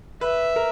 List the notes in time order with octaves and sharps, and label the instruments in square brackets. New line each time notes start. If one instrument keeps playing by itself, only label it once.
[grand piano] B4 [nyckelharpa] E5
[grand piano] A#4